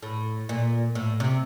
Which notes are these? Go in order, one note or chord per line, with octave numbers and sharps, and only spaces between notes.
A2
A#2
A2
C3